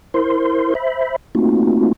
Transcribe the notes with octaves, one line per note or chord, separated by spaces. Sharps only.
E4 A#4 C5 C6
C5 E5 B5
A3 A#3 C4 D#4 F4 F#4